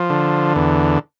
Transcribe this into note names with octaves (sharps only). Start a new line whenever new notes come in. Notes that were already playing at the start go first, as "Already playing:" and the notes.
Already playing: F3
D3
E2